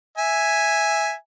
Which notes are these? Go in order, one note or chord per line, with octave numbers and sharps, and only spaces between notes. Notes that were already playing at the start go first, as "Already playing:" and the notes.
E5 G#5